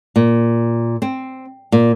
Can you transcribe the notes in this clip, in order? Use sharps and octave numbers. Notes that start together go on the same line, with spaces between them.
A#2
C4
A#2